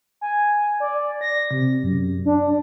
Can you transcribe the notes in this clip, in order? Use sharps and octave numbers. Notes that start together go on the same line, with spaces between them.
G#5
D5
A#6
C3
F#2
D4